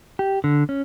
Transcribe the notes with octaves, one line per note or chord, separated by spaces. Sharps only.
G4
D3
C#4